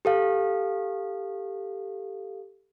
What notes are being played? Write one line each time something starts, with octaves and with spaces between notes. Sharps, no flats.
G4 A4 F5